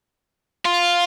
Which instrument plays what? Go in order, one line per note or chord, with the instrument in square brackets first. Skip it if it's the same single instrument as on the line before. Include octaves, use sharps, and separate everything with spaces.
[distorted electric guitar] F4